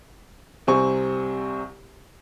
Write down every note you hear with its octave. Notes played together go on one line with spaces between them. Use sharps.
C2 C3 C4 G#5 C#6